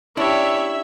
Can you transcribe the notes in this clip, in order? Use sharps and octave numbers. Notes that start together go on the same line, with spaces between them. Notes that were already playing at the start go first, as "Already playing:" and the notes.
C#4 D4 E4 G4 C#5 E5